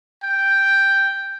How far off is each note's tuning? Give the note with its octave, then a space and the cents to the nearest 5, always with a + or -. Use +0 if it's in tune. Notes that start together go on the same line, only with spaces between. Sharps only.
G5 +0